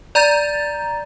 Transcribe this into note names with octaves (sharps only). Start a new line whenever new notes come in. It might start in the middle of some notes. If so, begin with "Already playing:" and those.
D5 A#5 G6 A6